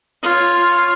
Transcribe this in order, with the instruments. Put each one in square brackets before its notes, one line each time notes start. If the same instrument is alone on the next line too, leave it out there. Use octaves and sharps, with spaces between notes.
[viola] F4 C#5